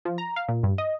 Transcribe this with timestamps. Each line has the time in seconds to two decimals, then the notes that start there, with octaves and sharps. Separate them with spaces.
0.05 F3
0.18 A#5
0.36 F5
0.48 A#2
0.63 G2
0.78 D#5